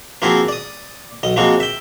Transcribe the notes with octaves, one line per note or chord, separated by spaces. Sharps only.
F3 A#3 C4 E4 F#4 G#4
D5 D#6
B1 D#5
F3 G#3 A#3 C4 F#4
E5 G5